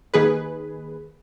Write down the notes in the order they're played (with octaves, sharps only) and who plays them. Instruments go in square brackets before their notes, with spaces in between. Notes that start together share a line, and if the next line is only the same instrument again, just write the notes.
[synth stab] D#2 D#3 G#4 B4